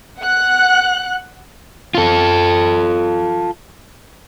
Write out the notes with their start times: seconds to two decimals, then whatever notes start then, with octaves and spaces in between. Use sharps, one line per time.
0.21 F#5 F#6
1.95 F4 A4